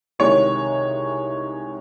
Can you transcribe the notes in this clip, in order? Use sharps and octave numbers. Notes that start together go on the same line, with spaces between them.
C2 C3 D#3 G#3 C#5